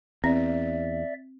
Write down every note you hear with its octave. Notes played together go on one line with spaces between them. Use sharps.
E2 C4 D5 E5